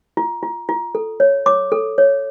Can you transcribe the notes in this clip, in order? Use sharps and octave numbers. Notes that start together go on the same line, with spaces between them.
F4
F4
F4
A4
C#5
C#5 D6
A4
C#5